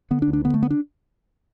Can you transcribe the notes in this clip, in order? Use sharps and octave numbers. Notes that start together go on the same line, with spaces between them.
D3 B3
D4
D2
D4
D3 B3
A3
B3
D4